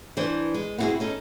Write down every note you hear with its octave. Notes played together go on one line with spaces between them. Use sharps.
E3 D4 E4 C5
G#3
B3 C4 D#4 E4 F#4 G#4
C#4 D#4 A4